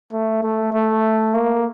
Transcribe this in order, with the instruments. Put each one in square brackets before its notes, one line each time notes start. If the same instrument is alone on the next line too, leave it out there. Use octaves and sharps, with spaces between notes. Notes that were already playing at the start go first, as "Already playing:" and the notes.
[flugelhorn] A3
A3
A3
A#3